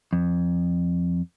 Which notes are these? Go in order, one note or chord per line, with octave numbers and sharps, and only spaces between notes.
F2